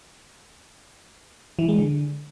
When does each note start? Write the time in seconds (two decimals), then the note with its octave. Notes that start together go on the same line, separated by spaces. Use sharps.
1.59 E3
1.68 G#3
1.78 D3